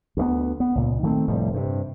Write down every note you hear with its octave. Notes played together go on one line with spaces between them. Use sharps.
D2 G3 B3
B3
C#2 A#2
D#3 A3 C4
F1 A2 F3 G3
G2 C3